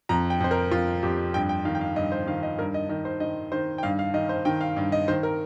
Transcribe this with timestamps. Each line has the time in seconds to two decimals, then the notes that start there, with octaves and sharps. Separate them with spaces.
0.09 F2 A#5
0.30 G5
0.40 F2 C5
0.51 A#4
0.71 F2 F4
1.03 F2 G4
1.34 G2 G5
1.49 G5
1.65 D#3 F5
1.75 G5
1.81 F5
1.96 G2 D#5
2.12 C5
2.27 D#3 F5
2.43 D#5
2.58 G2 A#4
2.74 D#5
2.89 D#3 D#5
3.05 C5
3.20 D#3 D#5
3.52 D#3 C5
3.78 G5
3.83 G2 F5
3.99 F5
4.14 D#3 D#5
4.29 C5
4.45 D#3 G5
4.61 F5
4.77 G2
4.92 D#5
5.08 D#3 C5
5.23 A#4